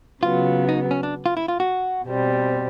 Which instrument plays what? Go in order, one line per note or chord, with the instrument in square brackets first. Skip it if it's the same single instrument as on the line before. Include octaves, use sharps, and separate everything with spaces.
[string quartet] C#3 F#3 B3 [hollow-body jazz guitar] F4
[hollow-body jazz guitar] D#4
C#4
D4
F4
E4
F4
F#4
[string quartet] B2 G3 C4